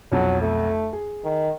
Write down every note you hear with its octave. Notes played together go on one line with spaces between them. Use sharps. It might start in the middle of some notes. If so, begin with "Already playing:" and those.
B1 F2 F#3
A3
G#4
D#3